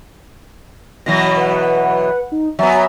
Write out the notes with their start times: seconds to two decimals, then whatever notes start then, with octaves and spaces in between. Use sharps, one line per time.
1.06 B2 E3 F#3 A#6
1.36 B4 F#5
2.32 D#4
2.59 F#3 B3 E5 G#5 A#5